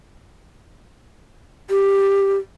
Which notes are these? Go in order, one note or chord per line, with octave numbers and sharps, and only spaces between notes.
G4